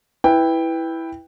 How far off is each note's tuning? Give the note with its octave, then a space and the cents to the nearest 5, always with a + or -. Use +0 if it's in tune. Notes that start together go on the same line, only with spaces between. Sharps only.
E4 +0 B4 +0 G5 +10